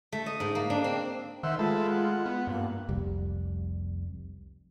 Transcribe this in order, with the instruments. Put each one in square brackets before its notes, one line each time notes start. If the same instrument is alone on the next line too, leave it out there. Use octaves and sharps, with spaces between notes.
[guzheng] A3
D#5
G#2
A#3
D4
C4
[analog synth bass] D#3 [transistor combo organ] C5 F#5 E6 [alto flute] E5
[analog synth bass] G#3 [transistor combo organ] A3 A4 B4 [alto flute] F4
[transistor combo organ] F#5
[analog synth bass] B3
[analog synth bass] G2 [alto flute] A#3
[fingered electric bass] F1 C2 G3